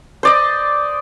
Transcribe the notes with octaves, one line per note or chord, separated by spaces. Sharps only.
C5 D5 D#5